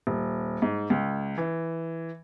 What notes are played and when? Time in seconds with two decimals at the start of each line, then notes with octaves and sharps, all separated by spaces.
0.07 D#1
0.62 G#2
0.90 C#2
1.38 E3